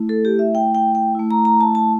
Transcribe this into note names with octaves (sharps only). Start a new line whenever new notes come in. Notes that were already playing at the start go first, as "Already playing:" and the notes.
Already playing: A3 E4
A4
G4
E5
G5
G5
G5
A3 E4
A#5
A#5
A5
A5